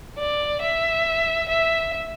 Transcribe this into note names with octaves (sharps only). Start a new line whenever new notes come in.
D5
E5
E5